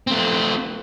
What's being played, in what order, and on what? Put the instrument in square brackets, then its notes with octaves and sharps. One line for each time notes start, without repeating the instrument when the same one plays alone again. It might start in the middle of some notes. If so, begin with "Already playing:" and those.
[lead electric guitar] A3 C4